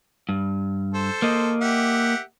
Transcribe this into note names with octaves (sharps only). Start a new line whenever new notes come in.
G2
A4 C5
A#3 D#5
G4 E5 F#5